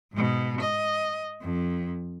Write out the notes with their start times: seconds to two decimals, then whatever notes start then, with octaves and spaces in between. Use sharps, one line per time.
0.13 G#2 B2
0.61 D#5
1.42 F2